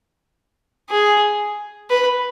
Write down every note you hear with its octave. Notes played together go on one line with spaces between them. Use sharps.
G#4
B4